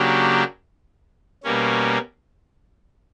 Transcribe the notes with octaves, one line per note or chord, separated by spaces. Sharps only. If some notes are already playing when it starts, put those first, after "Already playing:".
Already playing: C#3 F#3 A#3 D4 G4
B2 G3 A#3 C#4